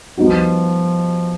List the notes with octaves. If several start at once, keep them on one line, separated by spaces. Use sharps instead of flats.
F3 G3 B3 D#4 F#4